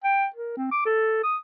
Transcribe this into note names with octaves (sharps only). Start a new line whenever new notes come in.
G5
A#4
C4
D6
A4
D#6